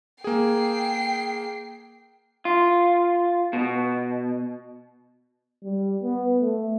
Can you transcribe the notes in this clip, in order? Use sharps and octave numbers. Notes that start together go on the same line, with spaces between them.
A#3 G#4 G5 C7
F4
B2
G3
B3
A3